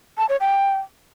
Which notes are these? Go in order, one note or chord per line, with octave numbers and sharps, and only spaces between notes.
A5
C#5
G5